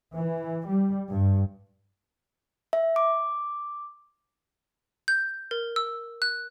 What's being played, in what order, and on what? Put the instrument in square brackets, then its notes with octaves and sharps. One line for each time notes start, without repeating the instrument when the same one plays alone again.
[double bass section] E3
G3
G2
[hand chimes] E5
D6
[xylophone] G6
A#4
E6
F#6